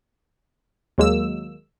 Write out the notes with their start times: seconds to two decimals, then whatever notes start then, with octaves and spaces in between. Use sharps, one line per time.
0.98 D#2 F#3 G#3 A#3 E6